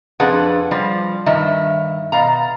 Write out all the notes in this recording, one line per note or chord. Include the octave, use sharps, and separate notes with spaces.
F2 D4 G#4 B4 F#5
F3 G3
G2 D#3 E5
B2 F5 A#5